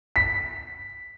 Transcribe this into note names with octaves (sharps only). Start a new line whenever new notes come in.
B6